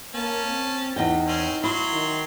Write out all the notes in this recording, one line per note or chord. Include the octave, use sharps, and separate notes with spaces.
A#3 C#4 A5
C4
E2 D#4 D#5 G5
C4 C#4
F#3 E4 C6
D#3